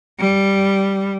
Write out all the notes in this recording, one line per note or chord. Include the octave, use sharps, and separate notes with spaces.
G3